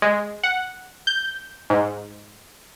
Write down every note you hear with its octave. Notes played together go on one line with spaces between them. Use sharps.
G#3
F#5
G6
G#2